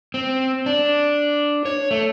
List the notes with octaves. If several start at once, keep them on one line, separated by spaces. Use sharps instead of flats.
C4
D4
C#5
A3